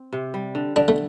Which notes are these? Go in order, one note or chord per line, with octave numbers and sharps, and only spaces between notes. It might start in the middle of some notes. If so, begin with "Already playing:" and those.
Already playing: C4
C3
G3
D3
D3 D4
A3